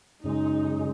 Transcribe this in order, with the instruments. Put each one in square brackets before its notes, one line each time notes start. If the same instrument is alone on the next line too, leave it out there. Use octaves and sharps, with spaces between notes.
[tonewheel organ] F#2 C#3 G#3 [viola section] D#4